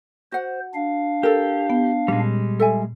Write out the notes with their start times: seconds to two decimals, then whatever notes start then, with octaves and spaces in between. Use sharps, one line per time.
0.32 F#4 C5 F#5
0.74 D4 F5
1.23 G4 A4 A#4
1.70 B3
2.08 A#2 G3 G#3 C#4
2.59 A4 E5 G#5